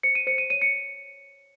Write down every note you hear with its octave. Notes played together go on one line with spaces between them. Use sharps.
C5 C#7
D#7
C5 C#7
D#7
C#5 D#7
C#7